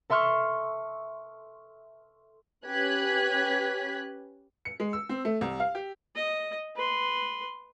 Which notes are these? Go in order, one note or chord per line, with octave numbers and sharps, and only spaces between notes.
A4 E5 C6 C#6 F6
C#4 G4 B4 F#6 G#6 B6
C#7
G#3
E6
C4
A3
C2
F5
G4
D#5
B4 C6